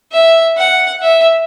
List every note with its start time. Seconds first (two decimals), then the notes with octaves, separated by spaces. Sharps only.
0.12 E5
0.57 F#5
1.02 E5